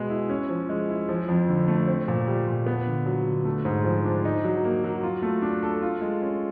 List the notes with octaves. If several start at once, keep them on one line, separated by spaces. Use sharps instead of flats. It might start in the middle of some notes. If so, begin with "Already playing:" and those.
Already playing: B2 G#3 B3
E4
C#4
F3
G#3
E4
F3
F2
D3
A3
C4
A#2
G3
A#2
B3
D3
F#3
D3
A3
G#2
F3
D4
D#4
F#3
A#3
F#3
F4
A3
D4
A4
F4
G#3
C#4